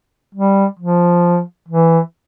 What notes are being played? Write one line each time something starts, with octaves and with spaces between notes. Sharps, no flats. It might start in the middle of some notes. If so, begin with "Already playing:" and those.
G3
F3
E3